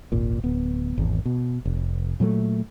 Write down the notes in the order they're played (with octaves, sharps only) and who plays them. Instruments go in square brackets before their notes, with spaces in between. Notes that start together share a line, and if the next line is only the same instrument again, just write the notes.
[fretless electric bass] D#1 G#1 A#2
D1 B3
G#1 E2
B2
F1
A#2 F#3 G#3 A3